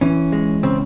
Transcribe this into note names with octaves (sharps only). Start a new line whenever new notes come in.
E3 C#4
G#3
C#3 C4